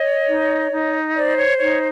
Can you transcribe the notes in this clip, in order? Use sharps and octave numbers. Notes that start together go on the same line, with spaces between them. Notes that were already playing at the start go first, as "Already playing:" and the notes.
Already playing: C#5 D#5
D#4
D#4
C5 D5
C#5
D#4 C#5